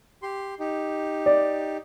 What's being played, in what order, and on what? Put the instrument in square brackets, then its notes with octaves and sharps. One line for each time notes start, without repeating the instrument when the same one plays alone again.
[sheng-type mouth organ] G4 C6
D#4 G4
[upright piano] D5